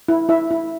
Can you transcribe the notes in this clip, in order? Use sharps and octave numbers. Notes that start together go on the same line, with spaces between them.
E4
E4 E5
E4